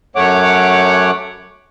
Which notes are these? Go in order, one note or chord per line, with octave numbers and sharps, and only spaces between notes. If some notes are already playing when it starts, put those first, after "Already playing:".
F#2 A3 C#5 F#5 D6